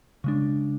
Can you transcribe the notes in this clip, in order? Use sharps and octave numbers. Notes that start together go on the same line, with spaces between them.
C#3 G#3 D4